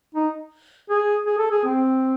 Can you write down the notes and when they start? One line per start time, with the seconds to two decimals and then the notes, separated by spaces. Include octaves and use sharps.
0.15 D#4
0.90 G#4
1.26 G#4
1.39 A4
1.51 G#4
1.64 C4